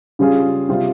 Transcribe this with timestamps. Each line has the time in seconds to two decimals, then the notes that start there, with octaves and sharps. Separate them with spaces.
0.19 C#3 G3 C#4 F4 G#4
0.69 C3 G3 C4 F4